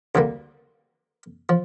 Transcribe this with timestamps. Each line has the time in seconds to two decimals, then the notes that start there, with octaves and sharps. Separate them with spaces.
0.15 D2 D3 G3 A#3
1.49 F3